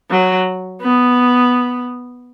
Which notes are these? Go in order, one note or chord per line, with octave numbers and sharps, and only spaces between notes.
F#3
B3